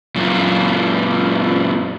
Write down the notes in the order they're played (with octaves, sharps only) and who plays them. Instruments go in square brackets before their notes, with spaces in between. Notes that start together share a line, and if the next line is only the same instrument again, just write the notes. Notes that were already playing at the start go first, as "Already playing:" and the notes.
[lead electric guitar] F#2 A#2